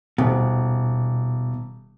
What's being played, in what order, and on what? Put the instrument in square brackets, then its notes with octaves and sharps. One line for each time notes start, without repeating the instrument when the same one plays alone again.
[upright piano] D#1 [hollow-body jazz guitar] B2